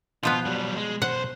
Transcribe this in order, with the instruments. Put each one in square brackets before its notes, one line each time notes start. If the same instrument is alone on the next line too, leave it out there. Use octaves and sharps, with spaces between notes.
[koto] B2 F3 B3 [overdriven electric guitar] F4
[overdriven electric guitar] F#3 G3
G#3
[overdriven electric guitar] B1 C5 [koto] F#5